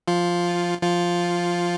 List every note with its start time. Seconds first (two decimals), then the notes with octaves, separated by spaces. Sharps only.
0.08 F3 F4
0.82 F3 F4